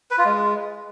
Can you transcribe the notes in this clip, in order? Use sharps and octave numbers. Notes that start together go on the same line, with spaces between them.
B4
F4
G#3